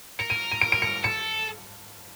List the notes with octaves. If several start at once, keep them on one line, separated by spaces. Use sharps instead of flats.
A#4 C#7
D#7
D#7
D7
D7
C#7
A4 C#7